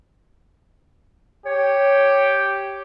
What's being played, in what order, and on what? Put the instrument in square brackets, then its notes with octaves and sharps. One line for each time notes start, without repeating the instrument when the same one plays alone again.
[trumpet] G4 [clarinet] C#5